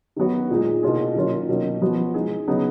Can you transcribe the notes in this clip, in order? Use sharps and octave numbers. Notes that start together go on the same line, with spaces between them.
D#3 F#3 B3 F#4
A#2 G#3 D#4 G#4
B2 A#3 F4 G#4
D#3 F#3 A#3 C#4 F4
B2 F#3 A#3 C#4
F3 B3 F#4
G#3 D#4 G#4
C#3 F#3 B3 D#4 G#4